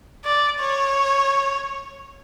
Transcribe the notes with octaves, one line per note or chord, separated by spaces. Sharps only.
D5
C#5